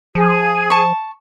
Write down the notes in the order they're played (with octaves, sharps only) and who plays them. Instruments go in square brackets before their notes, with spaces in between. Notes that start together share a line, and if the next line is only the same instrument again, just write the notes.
[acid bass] F3 [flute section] G#4
[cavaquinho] A5 C#6